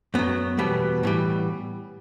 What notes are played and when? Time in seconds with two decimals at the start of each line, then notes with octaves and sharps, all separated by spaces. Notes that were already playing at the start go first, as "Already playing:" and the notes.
0.14 F#2 F#3 B3
0.58 E2 B2 G3 B3
1.03 A2 E3 G3